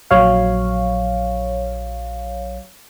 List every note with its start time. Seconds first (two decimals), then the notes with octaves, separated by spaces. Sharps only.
0.11 A#1 F#3 C#5 F5